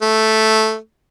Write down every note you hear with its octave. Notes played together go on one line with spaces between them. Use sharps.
A3